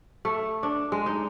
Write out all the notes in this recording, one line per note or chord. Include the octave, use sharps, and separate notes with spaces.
A3
D4
G#3
D#4